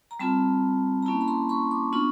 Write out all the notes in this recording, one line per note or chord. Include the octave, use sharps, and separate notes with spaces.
A#5
G3 C4 F4 A5 B5
A#5
A#3 C#4 E4 A5 B5
B5
A#5 C6
B5 C#6
C6 D6
B3 D4 F4 B5 C#6